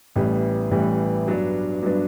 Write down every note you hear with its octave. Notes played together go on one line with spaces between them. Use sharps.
A1 A2 E3 G3 B3
A1 A2 E3 G3 B3
G2 F#3 B3 D4
G2 F#3 B3 D4